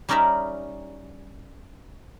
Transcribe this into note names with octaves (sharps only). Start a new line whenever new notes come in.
G3 C#4 D#4 A#4 D5 E5